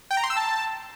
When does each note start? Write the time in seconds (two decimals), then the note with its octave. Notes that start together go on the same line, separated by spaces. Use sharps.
0.11 G5
0.17 A#5
0.24 C6
0.30 E6
0.37 A5